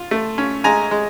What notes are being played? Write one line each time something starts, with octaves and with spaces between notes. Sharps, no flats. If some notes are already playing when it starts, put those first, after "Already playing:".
Already playing: F4
A3
C#4
G#3 G#5 A#5
G#3